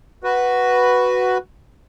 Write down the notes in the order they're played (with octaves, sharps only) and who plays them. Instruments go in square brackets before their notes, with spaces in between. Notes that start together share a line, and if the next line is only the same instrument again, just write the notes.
[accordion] F#4 B4